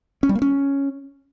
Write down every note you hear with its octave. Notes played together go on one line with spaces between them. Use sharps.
C#4
G3
A#3
C#4